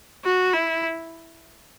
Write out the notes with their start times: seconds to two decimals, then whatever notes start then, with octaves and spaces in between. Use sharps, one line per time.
0.24 F#4
0.53 E4